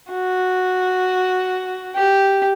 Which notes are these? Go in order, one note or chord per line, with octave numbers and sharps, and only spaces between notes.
F#4
G4